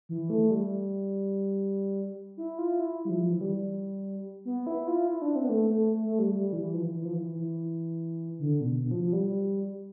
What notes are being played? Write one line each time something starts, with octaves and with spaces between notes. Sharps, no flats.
E3
A3
G3
E4
F4
E4
G3
F3
F3
E3
G3
B3
E4
F4
E4
D4
C4
B3
A3
A3
A3
G3
G3
E3
F3
E3
E3
F3
E3
E3
D3
B2
B2
F3
F3
G3